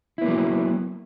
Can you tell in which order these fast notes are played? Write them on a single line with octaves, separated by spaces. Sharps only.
E4 B3 A#3 F#3